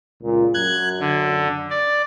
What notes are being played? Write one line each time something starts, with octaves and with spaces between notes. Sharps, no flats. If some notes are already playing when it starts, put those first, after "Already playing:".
C#2 A#2
F#2 F#6 G#6
D3
D5